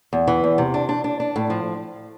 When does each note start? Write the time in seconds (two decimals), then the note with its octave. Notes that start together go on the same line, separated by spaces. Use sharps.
0.13 E2
0.28 E3
0.44 E2
0.58 C3
0.74 D4
0.89 D4
1.04 D4
1.20 D4
1.36 A2
1.50 F3